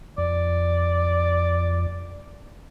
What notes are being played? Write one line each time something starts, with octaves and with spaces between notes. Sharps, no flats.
F2 D5